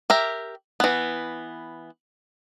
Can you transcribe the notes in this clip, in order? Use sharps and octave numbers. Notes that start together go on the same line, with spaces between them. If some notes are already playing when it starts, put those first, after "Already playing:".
G4 A#4 E5
E3 B3